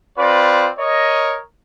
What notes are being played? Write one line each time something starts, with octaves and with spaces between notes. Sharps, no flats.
C4 F4 B4 D5
A#4 C#5 D#5